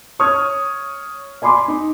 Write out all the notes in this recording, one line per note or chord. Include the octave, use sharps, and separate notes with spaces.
C#5 C#6 D#6 F6 G#6
D5 G#5 B5 C6 D6
D#4